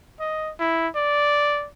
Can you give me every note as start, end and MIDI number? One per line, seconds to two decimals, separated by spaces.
0.20 0.51 75
0.59 0.88 64
0.95 1.67 74